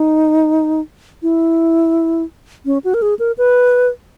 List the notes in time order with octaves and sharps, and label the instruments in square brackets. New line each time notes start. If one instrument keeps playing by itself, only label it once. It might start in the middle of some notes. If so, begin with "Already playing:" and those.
Already playing: [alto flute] D#4
E4
C#4
F#4
A#4
G#4
A#4
B4